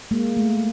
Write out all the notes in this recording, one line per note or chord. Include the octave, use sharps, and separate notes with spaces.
G#3 A#3
A3